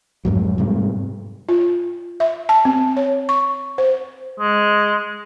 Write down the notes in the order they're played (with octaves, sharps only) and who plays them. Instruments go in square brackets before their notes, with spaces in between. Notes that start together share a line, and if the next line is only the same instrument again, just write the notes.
[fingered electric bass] F2 G#2 F#3
G#2 C3 G3
[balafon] F4
E5
A5
C4
C#5
C#6
C5
[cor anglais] G#3